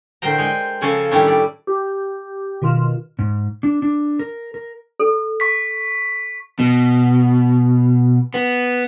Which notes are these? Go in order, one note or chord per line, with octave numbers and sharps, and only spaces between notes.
A2 D3 A#4 C5 G5 A#5
G#3 G5
C#3 F3 C#4 A4 G#5
A2 D#3 G3 C#4 D4 E4
D5
G4
B2 D#3 F4 F6 E7
G#2
D4
D4
A#4
A#4
A4
C#6 B6
B2
B3